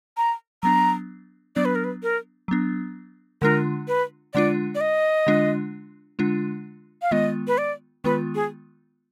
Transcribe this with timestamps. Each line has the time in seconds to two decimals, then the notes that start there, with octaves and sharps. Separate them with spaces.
0.17 A#5
0.63 F#3 B3 D4 A#5
1.56 F#3 B3 D4 D5
1.65 B4
1.75 A#4
1.84 B4
2.03 A#4
2.48 F#3 B3 D4
3.42 D3 G#3 D4 F4 A#4
3.88 B4
4.34 D3 G#3 D4 F4 D5
4.75 D5
4.81 D#5
5.27 D3 G#3 D4 F4
6.19 D3 G#3 D4 F4
7.02 F5
7.11 D#3 G#3 B3 F4 D#5
7.48 B4
7.58 D5
8.04 D#3 G#3 B3 F4 B4
8.35 G#4